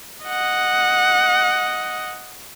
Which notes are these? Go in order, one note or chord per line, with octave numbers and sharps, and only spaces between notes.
D#5 F#5